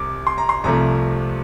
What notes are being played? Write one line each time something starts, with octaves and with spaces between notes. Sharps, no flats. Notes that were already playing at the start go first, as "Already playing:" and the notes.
Already playing: C2 C3 D6
C6
A#5
C6
C2 C3 F3 A3 A#5